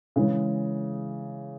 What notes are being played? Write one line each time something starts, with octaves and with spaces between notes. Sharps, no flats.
C#3 E3 G#3